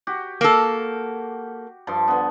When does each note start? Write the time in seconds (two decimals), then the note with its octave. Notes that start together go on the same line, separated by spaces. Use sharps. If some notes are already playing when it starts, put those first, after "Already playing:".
0.07 F#4 G4
0.41 A#3 A4
1.87 G2 F3 C6
2.08 D3 B3